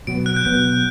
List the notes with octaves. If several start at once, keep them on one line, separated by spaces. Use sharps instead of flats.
B2 F#3 B3 D7
F#6
G6
B2 F#3 B3 F#6